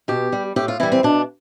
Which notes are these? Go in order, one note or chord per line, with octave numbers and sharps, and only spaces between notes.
B2 G4
G3
A2 G4
F4
E3 G3 E4
C4
B2 D4